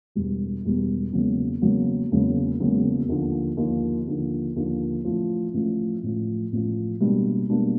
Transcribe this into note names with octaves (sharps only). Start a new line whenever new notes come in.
E1 E2 B2 G3
E1 E2 B2 G3
E1 E2 C#3 F#3 A#3
E1 E2 C#3 F#3 A#3
E1 E2 C#3 F#3 A#3
E1 E2 C#3 F#3 A#3
D#2 D3 F3
D#2 D3 F3
D#2 D3 F3
D#2 D3 F3
A1 A2 F3
A1 A2 F3
A1 A2 F3
A1 A2 F3
B2 G3 A#3 D4
B2 G3 A#3 D4